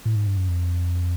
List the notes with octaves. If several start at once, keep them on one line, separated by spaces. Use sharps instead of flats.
A2
G#2
G2
F#2
F2